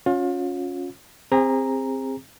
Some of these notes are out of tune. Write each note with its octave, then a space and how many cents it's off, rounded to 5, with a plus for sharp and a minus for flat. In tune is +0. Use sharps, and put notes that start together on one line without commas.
C#4 +0 F4 +35
C4 +10 G#4 -35 A#5 +0